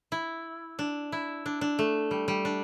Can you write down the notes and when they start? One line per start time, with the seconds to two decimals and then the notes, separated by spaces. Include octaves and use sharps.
0.12 E4
0.79 D4
1.12 E4
1.46 D4
1.61 D4
1.79 A3
2.11 G3
2.28 G3
2.45 D4